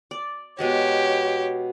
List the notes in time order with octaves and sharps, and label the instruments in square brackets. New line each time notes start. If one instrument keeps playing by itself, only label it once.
[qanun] D5
[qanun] B2 G#3 A5 [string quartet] G4 C#5